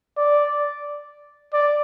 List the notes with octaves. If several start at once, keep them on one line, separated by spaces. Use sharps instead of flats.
D5
D5